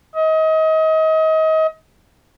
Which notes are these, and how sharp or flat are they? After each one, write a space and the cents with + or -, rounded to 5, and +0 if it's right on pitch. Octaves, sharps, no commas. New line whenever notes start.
D#5 +30